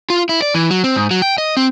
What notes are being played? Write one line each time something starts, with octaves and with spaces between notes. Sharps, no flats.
F4
E4
D5
E3
F#3
C4
G#2
F#3
G5
D#5
C4